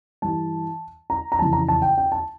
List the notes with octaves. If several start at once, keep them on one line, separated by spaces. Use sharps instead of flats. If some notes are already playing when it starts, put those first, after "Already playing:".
G2 E3 A5
A#5
A#5
F2 C#3 E3 A5
A#5
A5
G5
G5
A5